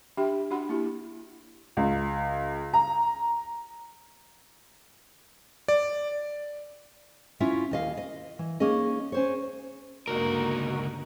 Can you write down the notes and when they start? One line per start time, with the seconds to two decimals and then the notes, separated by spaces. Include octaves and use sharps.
0.17 D4 G4 E5 G5 B5
0.51 D4 F#4 F#5 B5
0.69 A#3 E4 G4
1.77 C#2
2.74 A#5
5.68 D5
7.40 C#4 E4 F4 E5
7.71 D#2 D#5 F5
7.97 D#5
8.39 E3
8.60 A#3 C#4 D#4 G#4 D#5
9.12 C#4 C5 C#5
10.08 C#2 G2 D3 A#3 B3 D#4 F#4 A#4